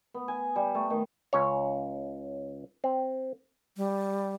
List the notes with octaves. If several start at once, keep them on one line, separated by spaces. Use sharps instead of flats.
B3
G#5
G3
A3
D#3
C#2 C#4 C#5
C4
G3